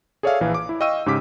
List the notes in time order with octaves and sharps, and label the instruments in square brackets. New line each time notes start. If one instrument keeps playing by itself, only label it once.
[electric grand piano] G#4 A4 C#5 D5 E5 F5
A#1 E3 F5
D6
E4
D#5 F5 G5 C#6 E6 D#7
G#2 C#3 G4 D6 B6